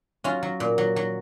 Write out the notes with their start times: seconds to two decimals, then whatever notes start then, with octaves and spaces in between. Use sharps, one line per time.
0.24 F#3 C#4 F4
0.43 F#3
0.60 A#2
0.78 F#3
0.96 F#3